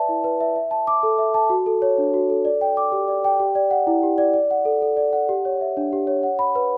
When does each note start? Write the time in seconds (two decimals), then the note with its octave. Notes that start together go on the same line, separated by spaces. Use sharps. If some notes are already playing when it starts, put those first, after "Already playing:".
Already playing: B4 D5 E5 A5
0.09 E4
0.24 B4
0.40 E5
0.56 E5
0.71 A5
0.87 D6
1.03 A4
1.18 E5
1.34 A5
1.50 F#4
1.66 A4
1.82 C#5
1.98 D4
2.14 F#4
2.30 A4
2.45 D5
2.61 G5
2.77 D6
2.92 G4
3.08 D5
3.24 G5
3.40 G4
3.55 D5
3.71 F#5
3.87 E4
4.03 G4
4.18 D5
4.34 D5
4.51 F#5
4.65 A4
4.82 A4
4.97 D5
5.13 F#5
5.29 G4
5.45 C#5
5.61 E5
5.77 D4
5.93 G4
6.07 C#5
6.23 F#5
6.39 B5
6.55 B4